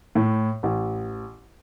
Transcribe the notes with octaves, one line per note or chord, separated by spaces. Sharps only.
A2
A1